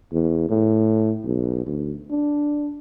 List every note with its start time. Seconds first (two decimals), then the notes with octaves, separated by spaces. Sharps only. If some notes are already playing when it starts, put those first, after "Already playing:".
0.12 E2
0.49 A2
1.25 B1
1.66 D2
2.11 D4